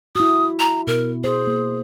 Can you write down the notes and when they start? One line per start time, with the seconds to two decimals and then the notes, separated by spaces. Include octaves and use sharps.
0.15 E4 F#4 D#6
0.59 A#5
0.87 B2 A#4
1.24 G#4 C5
1.47 A#3